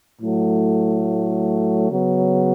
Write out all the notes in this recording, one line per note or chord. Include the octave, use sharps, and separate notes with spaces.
A2 F#3 A3
C#3 F#3 B3